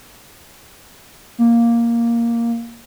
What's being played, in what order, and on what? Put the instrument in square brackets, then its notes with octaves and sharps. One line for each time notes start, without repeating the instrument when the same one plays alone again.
[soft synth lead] A#3